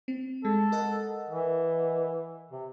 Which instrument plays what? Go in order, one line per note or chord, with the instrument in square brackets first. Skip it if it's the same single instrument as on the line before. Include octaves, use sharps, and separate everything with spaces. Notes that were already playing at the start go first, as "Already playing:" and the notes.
[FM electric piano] C4
[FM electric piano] G#3 [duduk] A4
[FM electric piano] A#4 D#5 F#5
[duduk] E3
C3